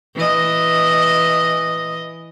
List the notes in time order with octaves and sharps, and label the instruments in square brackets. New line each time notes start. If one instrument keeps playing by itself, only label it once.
[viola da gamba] E3 D#5